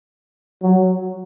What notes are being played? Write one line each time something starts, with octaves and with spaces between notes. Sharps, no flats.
F#3